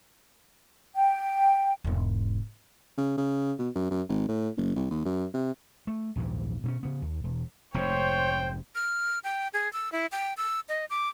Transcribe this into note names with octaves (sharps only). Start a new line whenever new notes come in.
G5
E1 G#2
C#3
C#3
B2
F#2
F#2
G#1
A2
F#1
C2
D#2
F#2
C3
A3
A#1 D#2 G#2 E3
B2 C4 C#4
C#3 B3
D#2
E1
F1 G#2 C5 C#5 G5
F6
G5
G#4
E6
E4
G5
E6
D#5
D6